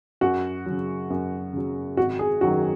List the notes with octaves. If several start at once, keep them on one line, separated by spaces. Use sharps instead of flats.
F#2 F#4
C#3 F#3
F#2
C#3 F#3
G#1 F#4
G#4
F#2 D#3 F#3 F#4